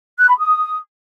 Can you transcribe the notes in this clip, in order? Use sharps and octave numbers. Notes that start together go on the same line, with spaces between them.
F#6
B5
D#6